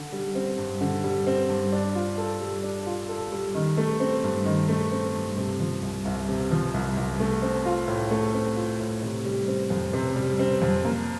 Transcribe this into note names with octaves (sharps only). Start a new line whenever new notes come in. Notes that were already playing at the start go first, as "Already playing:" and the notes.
Already playing: D3
G3
C4
G2
D3
G3
C4
G2
D4
F4
A4
G3
D4
F4
A4
G3
D#3
A3
C4
G2
D#3
A3
C4
G2
C3
F3
C2
C2
C3
F3
C2
C2
A3
C4
F4
A2
A3
C4
F4
A2
C3
G3
C4
F2
C3
G3
C4
F2
A#3